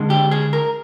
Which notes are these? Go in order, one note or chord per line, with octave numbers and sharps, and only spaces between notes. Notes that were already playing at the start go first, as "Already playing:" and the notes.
Already playing: D3 G#3
G4
G#4
A#4